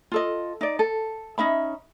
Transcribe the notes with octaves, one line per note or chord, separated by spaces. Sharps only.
F4 A4 D#5
D#4 D5
A4
C#4 D#4 E5 B5